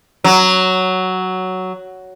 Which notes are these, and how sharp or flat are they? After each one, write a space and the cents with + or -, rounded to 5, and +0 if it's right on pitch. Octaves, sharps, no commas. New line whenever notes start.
F#3 +5